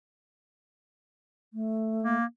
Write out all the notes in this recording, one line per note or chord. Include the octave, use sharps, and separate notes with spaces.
A3
A#3